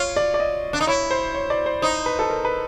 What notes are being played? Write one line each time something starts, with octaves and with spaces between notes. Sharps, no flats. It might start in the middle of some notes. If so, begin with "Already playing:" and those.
Already playing: F4 C#5
D5
D5
D#5
D4
D#4
E4 C#5
C5
C#5
D5
C5
D#4 C5
B4
A4
A#4
B4